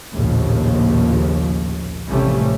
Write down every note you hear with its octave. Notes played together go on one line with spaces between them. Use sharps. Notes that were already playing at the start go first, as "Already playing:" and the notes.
A#1 D#2 A2 C#3 F3
A1 F2 C3 G3 A3 C#4